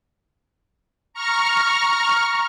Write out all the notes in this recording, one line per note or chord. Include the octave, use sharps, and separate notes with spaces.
A#5 C#6 F6